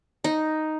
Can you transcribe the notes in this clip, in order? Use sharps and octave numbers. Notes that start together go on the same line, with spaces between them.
D#4